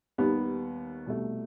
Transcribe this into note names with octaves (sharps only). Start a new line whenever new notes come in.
D#2 D#3 G3 B3
C2 B2 A3